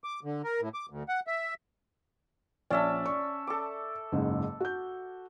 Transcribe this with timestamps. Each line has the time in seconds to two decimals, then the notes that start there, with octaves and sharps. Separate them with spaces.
0.04 D6
0.24 D3
0.44 A#4
0.61 A2
0.74 D6
0.90 D2
1.08 F#5
1.27 E5
2.70 A#1 C#4 D5 E5 A5
3.05 D5 C#6
3.47 A4 D6
4.12 F#1 G#2 C#3
4.60 F#4 G6